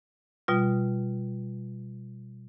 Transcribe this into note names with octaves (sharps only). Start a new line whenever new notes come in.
B2 G3 F4